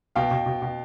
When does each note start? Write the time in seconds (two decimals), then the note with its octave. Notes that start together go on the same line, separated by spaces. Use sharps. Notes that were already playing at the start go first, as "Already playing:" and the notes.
0.16 B2 F5 G5
0.31 B2
0.46 B2
0.62 B2